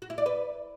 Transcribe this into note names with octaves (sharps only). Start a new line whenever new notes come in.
F#4
E4
D5
B4